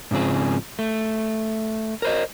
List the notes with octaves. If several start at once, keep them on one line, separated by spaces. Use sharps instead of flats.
G#2 C#3 F3 C4 G#4
A3
A#4 C5 D#5